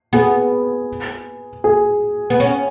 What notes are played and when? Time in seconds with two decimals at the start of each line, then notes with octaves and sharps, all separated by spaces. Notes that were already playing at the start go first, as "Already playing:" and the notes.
0.13 B3 G#4
1.64 G#4
2.30 B3
2.40 C#4